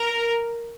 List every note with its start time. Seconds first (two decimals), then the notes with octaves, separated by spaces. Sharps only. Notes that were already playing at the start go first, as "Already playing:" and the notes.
Already playing: A#4